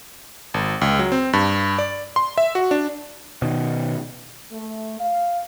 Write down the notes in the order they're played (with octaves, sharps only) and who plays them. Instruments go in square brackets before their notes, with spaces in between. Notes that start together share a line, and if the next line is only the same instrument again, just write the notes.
[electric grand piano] G#1
C#2
F#3
C4
G2
D5
C6
E5
F#4
D4
[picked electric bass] B2 D#3
[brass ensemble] A3
F5